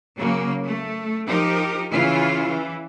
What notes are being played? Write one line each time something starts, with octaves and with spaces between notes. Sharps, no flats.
C#3 F#3 A#3
A3
F3 D#4 G4 A#4
C#3 E3 E4 F4
E3